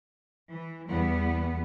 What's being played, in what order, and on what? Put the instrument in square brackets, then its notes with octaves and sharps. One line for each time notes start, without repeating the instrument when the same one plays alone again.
[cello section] E3
E2 G3 B3